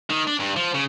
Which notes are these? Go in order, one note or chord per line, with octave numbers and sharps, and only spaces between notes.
D#3
D4
G2
F3
C#3